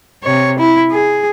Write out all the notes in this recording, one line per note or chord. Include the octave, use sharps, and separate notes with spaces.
C3 C#5
E4
G#4